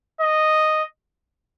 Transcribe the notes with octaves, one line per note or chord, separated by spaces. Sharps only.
D#5